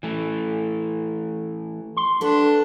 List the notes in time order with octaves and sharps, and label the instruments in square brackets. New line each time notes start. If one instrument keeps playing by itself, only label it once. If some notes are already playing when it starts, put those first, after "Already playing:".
[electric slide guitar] E3 A3
[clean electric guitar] C6
[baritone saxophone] D4 [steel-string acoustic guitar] A4 B4 F#5